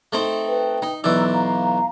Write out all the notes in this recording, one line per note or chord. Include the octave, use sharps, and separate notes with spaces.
A3 C4 D#4
B4 G5
D#4
B1 E3 D5 A#5 E6
F5 A#5